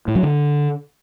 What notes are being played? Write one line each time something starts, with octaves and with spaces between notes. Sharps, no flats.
A2
F#3
D3